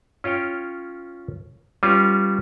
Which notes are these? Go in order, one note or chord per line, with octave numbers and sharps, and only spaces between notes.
C#4 F4 C#5 G5
G3 B3 C#4 F4